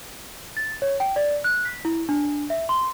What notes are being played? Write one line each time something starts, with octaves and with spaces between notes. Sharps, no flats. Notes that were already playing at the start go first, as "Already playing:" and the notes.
A6
C#5
G5
D5
F#6
B6
E4
D4
E5
C6